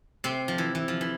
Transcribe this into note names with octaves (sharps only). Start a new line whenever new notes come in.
C3 C4
F3
E3
E3
F3
E3